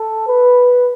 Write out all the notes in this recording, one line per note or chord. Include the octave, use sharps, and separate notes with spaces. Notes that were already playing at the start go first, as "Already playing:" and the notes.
Already playing: A4
B4